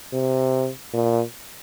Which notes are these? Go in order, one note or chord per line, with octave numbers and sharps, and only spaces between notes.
C3
A#2